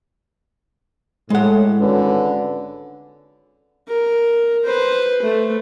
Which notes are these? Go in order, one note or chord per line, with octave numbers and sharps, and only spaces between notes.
A2 G#3 F#5
G#1 D3 C#4 B4
A#4
B4 C5
A3